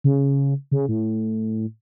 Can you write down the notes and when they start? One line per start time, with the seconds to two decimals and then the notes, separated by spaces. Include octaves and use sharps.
0.04 C#3
0.71 C#3
0.88 A2